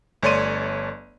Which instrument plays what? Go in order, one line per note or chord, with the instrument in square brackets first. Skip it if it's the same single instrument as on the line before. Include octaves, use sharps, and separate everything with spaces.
[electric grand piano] G1 A3 C#5 D5 C6 D#7